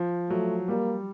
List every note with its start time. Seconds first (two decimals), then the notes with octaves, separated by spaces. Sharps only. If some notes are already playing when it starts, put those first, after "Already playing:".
Already playing: F3
0.30 F#3 A3
0.68 G3 A#3